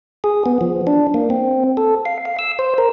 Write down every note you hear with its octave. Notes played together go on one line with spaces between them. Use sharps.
G#4
B3
F3
D4
A#3
C4
A4
F5
F5
E6
C5
A#4